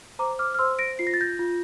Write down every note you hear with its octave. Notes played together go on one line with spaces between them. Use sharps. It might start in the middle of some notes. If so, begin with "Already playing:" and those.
C5 A#5 D6
D6 F6
F6
C5 C6 E6
A#6 D7
F4 C7
A#6
A6
G6 A#6
F4